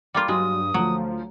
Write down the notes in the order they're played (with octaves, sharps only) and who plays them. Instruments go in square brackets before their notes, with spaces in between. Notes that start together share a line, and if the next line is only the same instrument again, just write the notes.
[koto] G3 A#3 F4
[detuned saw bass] G2 [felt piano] F#3 [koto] G#3 [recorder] D#6
[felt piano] D2 [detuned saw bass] F3 [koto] F#3